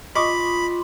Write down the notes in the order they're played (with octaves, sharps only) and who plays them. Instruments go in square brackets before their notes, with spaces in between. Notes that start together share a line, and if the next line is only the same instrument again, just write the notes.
[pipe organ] F4 [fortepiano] D#5 C#6 D6 [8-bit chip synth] B5